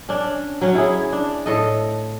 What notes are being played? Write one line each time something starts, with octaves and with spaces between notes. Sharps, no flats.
C#4 D4
F#3 C#4
E4 G#4
D4
A2 A4 D#5